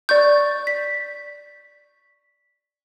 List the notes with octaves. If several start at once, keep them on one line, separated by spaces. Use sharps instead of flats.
D5 C#6 G6
B6